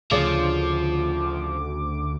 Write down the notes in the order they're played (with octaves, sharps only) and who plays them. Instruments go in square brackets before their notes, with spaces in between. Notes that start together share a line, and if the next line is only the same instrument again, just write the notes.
[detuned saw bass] D2 [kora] C#3 D5 [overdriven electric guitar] F3 [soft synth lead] D6